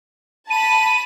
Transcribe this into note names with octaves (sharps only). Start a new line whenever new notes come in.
A5 B5 D#7